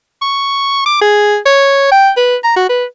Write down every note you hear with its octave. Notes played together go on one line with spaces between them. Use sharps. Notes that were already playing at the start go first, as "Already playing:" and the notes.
C#6
D6
G#4
C#5
G5
B4
A#5
F#4
B4